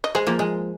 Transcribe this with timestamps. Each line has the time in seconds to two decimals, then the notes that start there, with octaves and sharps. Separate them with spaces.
0.04 D#5
0.15 G#3 G#4 C5
0.27 F3 A#3
0.39 G#3